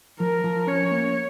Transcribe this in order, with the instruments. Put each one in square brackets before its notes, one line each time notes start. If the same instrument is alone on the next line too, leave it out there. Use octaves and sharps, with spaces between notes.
[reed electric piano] F3 [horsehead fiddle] A#4
[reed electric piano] F3
[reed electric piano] C#4 [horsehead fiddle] C#5
[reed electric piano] A#3